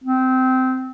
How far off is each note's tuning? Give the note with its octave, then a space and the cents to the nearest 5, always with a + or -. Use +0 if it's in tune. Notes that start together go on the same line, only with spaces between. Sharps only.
C4 -20